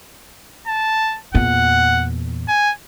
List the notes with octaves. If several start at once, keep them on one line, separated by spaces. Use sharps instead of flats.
A5
E2 A#2 F#5
G#5